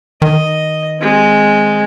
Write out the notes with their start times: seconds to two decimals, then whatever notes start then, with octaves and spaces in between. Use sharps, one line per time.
0.22 D#3 D#5
1.00 G#3 C4